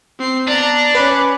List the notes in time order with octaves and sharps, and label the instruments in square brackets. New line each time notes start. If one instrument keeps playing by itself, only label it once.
[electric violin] C4 C7
[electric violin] B3 A#5 [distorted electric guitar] D4
[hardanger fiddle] C#4 [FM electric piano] B4 B5 [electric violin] D6 F#6